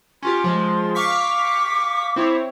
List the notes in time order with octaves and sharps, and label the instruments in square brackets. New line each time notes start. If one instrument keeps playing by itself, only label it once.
[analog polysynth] C#4 F4 G4 [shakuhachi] C6
[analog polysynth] F3 G#3
[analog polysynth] F5 C#6 B6 [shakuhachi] D6
[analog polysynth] C4 E4 C#5